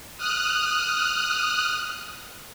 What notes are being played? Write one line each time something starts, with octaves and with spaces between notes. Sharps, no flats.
D#6 F6 F#6